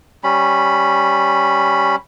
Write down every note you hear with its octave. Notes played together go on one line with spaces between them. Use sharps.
G3 C#4 B5